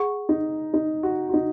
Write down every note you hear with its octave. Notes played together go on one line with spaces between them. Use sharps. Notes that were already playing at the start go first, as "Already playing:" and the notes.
Already playing: G#4 F#5 C#6
D#4
D#4
F#4
F#4
D#4